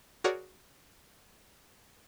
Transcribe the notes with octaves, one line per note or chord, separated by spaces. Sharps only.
F#4 G#4 A#4 C#5 D5 F#5